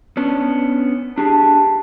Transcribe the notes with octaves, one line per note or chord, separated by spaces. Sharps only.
B3 C#4 D4
D4 G4 G#4 A5